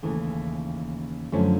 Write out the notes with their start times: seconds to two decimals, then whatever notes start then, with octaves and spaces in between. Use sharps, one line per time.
0.03 D#2 C#3 E3 A3
1.32 F#2 D3 F3 A3 C#4